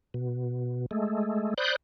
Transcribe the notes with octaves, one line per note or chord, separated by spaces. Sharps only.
B2
G#3 A3
C5 D5 B5 D#6 F#6 G6